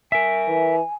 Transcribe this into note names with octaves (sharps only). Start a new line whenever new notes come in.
A#4 E5 G#5
E3